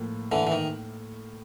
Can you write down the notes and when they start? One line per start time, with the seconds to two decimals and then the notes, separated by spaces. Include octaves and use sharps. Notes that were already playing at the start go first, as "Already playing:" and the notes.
Already playing: A2 F3 A#3
0.32 D3 E3
0.47 E3
0.52 D#3